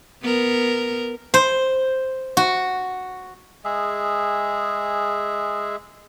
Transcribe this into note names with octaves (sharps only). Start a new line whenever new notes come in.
B3 A#4
C5
F#4
G#3 G#4 E5